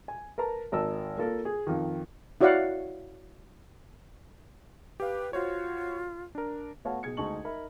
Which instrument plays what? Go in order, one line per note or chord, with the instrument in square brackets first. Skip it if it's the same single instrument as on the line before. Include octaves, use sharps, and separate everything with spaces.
[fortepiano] G#5
A#4 B4 A5 A#5
G#1 A#4 D#5 A5 E6
A#3 F4 A4 A#4
G#4
F2 D#3
[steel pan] E4 F#4 C#5 D5 F5 F#5
[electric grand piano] G4 F5 [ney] B4
[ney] F4 [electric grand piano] F#4 C5 C#5
[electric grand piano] D4 A#4
[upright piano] A3 B3 F#4 C#5 F5 A5
B1 G#4 G#6 C#7
D2 G#3 D#4 A5 C#6 F#7
D#4 A#4 E5 B5